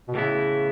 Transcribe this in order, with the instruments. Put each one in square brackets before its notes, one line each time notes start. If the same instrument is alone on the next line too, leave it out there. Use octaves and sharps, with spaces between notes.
[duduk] B2
[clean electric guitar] A2 E3 B3 E4 [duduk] C#3